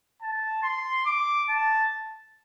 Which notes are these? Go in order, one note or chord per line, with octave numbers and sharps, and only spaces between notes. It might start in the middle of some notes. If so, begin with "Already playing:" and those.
A5
C6
D6
A5